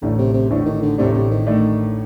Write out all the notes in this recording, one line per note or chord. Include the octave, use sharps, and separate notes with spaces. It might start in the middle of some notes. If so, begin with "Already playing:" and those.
A1 A2 D3 A3 D4
C3
C3
A1 A2 D3 A3 D4
D#3
D3
A1 A2 C3 A3 D4
C3
D#3
A2 A3 D4